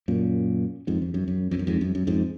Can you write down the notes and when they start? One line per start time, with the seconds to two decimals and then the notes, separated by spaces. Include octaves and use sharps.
0.08 F#2 A#2
0.87 F2 G#2
1.02 F2
1.14 F#2
1.28 F#2
1.51 F2
1.59 F#2
1.67 F2 G#2
1.81 F#2
1.95 F#2
2.07 F2 G#2